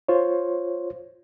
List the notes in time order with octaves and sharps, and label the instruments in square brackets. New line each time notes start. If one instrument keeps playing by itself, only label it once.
[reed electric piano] F4 C5 C#5